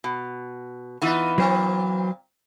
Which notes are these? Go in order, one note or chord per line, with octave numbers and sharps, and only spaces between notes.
B2
E3 B3 D#4 F4
A#2 F#3 C4 C5